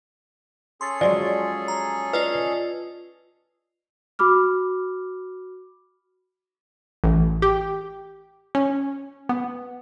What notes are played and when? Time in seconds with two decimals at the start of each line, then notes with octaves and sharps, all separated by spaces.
0.81 C#4 G#4 A4 C6 A6
1.01 F3 F#3 G#3 D5
1.68 A#5
2.13 F4 B4 D5 D#5
4.19 F#4 B5 D6 F6
7.04 A1
7.42 G4
8.55 C#4
9.29 B3